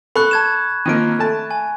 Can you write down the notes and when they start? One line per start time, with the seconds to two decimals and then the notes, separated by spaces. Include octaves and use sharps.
0.16 A4 B5 C#6 F#6
0.31 A5 G#6 E7
0.86 D#3 F3 A#3 D7 D#7
1.19 A3 A5
1.51 G#5